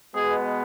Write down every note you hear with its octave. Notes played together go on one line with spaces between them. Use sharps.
B2 G#3 B3 G#4